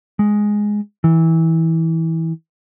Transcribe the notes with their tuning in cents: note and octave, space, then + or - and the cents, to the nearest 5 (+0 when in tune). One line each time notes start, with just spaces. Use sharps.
G#3 +0
E3 -20